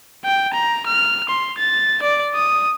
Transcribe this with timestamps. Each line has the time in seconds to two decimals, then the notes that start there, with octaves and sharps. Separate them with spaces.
0.24 G5
0.54 A#5
0.86 F6
1.29 C6
1.58 A6
2.03 D5
2.35 D#6